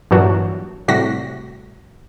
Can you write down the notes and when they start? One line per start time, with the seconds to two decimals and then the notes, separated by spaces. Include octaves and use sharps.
0.11 G2 A#2 E3 F#3 D4 F#4
0.88 A2 C3 G3 F#4 A#6 B6